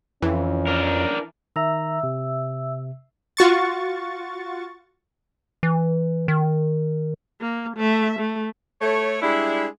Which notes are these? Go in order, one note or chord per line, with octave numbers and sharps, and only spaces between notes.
F2 E3 C#4
D4 A#4
D#3 E5 A#5 E6
C3
F4 F#4 C#6 A6
E3
D#3
A#3
A3 E5
A3
A3 C#5
G3 G#3 D4 E4